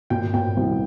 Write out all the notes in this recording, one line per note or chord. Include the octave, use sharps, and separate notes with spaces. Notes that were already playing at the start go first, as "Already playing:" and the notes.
A#2 G5
A#2 G5
C2